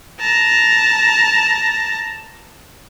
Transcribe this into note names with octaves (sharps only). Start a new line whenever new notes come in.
A5 A#5